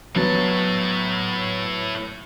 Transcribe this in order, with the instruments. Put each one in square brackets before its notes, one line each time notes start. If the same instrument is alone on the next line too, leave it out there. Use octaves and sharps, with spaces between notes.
[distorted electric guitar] A2 A5 [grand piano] F#3 B3